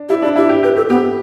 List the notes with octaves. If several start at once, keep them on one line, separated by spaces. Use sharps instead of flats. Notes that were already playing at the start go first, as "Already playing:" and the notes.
Already playing: D4
E4 G4
D4 E4
E4 G4
G4
G4 B4
G4 A4
B3 G4